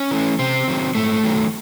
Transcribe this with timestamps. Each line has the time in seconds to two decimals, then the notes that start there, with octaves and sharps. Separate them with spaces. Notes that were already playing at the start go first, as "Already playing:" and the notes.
Already playing: C#4
0.11 E3 A3
0.39 C3 C4
0.68 D#3 F#3
0.95 G#2 A3
1.24 D#3 F#3